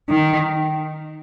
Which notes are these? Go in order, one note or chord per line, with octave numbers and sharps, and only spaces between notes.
D#3